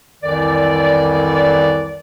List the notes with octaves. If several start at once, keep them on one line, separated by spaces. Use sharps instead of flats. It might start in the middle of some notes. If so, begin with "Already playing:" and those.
C2 F2 D#3 E3 D5